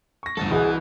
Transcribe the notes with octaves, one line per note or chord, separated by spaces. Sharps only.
C#6 A#6
A1 D2 G2 A4 A6
C2 E3 F#4 G#4 D#5